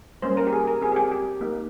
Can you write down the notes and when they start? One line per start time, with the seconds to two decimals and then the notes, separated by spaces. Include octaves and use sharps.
0.22 G3 A#3 C#4 C5
0.37 A#4
0.47 G4
0.53 G#4
0.67 A#4
0.82 C4 G#4
0.86 G4
0.92 G#4
0.96 G4
1.12 G4
1.41 A#3 D#4 G4